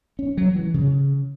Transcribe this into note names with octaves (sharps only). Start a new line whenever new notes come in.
C#4
F#3
E3
C#3